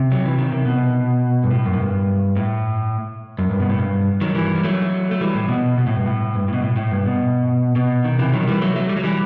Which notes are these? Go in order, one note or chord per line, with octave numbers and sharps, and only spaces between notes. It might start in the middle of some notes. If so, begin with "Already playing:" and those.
Already playing: C3
F#3
E3
D#3
C3
B2
G2
A2
F#2
A2
G2
A2
F#2
G2
B2
A2
G2
D#3 F#3
E3 G3
G3
F#3 A3
A3
E3 G3
A2
B2
B2
A2
G2
A2
G2
A2
B2
A2
A2
G2
B2
B2
D#3
C3 E3
D#3 F#3
E3 G3
F#3 A3
F#3 A3
G3
F#3
E3 G3